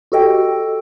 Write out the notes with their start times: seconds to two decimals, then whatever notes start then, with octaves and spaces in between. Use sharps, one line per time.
0.12 F#4 G4 A4 D#5 G5